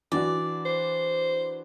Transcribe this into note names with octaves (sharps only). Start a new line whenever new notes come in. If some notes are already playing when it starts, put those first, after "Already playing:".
E3 D4 F#4 D5
C5